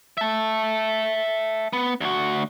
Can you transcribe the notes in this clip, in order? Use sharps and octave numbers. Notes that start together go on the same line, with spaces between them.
E5 A5
B3
D2 F#4